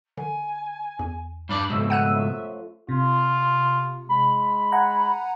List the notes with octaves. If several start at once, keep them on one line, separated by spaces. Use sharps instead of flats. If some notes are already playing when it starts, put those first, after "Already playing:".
D3 G#5
E2
G2 D4 D5 B5
C#2 G#2 B2 A3 F5 E6
F#5 F#6 D#7
F#2 F3 E5
C3 F4
G#3 B5
F#5 G#5 A#5